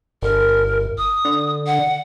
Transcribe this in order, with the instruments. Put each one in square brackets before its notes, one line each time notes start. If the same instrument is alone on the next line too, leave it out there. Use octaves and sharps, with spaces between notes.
[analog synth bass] G1 [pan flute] A#4
[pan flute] D#6
[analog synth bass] D3
[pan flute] F#5